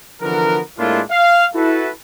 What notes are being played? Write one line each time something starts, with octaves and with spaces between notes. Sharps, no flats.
D3 E3 F3 B3 F#4 A#4
A2 G#3 A#3 D4 E4 F4
F5
E4 F#4 A4 B4